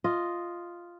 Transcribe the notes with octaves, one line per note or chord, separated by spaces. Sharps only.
F4 D#5